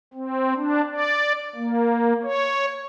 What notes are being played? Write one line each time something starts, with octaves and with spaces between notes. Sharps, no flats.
C4
D4
D5
A#3
C#5